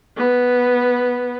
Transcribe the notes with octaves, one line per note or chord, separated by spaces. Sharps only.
B3